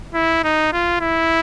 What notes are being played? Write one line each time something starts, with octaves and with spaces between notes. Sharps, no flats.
E4
D#4
F4
E4